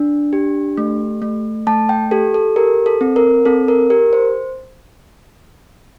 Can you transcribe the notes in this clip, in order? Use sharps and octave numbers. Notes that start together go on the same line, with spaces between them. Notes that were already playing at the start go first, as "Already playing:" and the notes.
Already playing: D4
G4
A3
A3
A3 A5
G5
G4 A4
A4
G4 A#4
A4
C4
A#4
C4 A4
A#4
G4 A#4
C5